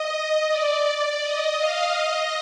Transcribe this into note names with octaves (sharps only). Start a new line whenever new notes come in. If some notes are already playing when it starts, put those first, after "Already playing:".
Already playing: D#5
D5
D5
D#5
F5
D#5